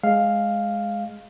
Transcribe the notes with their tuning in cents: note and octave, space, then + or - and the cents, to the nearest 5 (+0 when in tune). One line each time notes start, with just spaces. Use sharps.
G#3 +0 F5 +0